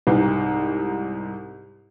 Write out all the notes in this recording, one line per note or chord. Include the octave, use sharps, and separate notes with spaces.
C2 G#2